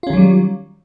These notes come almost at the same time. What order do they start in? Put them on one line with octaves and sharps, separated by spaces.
F4 C#4 D#3 F#3 G3